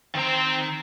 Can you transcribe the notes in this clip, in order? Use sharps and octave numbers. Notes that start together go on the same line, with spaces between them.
D#3 C4 A#5